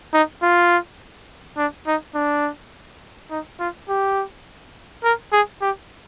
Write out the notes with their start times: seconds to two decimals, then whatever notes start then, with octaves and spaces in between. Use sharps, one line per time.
0.13 D#4
0.43 F4
1.58 D4
1.87 D#4
2.15 D4
3.31 D#4
3.60 F4
3.89 G4
5.04 A#4
5.32 G#4
5.62 G4